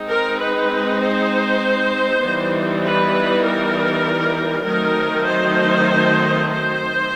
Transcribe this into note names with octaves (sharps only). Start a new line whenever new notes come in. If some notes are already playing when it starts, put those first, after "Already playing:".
Already playing: G#3 C4 D#4
A#4
B4
C5
E3 G3 B3 D#4
B4
A#4
D#3 F#3 A3 C4 D#4 A#4
C5
C5